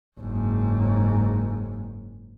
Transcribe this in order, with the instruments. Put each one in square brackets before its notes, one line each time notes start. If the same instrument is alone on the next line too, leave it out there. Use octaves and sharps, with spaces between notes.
[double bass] F#1 G#2